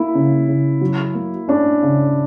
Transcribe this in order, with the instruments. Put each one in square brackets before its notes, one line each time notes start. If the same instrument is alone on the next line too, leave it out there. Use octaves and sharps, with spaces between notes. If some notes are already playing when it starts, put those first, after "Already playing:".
Already playing: [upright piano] A#3 [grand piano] E4
[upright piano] C#3
C#3
F#3
A#3
[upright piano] C#4 [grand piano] D4
[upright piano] C#3